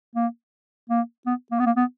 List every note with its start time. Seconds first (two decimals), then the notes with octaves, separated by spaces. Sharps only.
0.15 A#3
0.90 A#3
1.26 B3
1.51 A#3
1.59 B3
1.66 A#3
1.77 B3